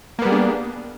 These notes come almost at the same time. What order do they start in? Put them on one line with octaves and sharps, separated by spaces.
A#3 B3 G3 G#4 D4